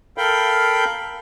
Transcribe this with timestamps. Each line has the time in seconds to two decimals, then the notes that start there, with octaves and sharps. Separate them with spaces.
0.18 A4 A#4 F5 G5 B5 G6